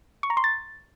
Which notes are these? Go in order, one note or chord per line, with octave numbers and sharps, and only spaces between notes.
C#6
A#5
C6
A6